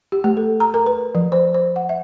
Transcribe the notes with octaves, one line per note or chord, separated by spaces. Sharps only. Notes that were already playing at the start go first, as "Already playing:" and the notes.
G4
A3
A4
A#5
A#4
B4
F3
C5
C5
F#5
E5